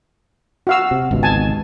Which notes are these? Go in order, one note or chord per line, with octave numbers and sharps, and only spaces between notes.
F#4 F5 E6
C3
G#1 C#2 B2
G#5 A5